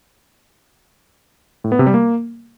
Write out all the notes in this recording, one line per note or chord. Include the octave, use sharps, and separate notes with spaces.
A2
B3
C3
G3
A#3